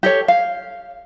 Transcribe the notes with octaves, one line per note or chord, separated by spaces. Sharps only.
G4 A4 C#5
F5